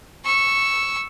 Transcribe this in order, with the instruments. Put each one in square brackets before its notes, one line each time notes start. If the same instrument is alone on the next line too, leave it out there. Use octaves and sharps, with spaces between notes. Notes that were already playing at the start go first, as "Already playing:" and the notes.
[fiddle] C#6 E6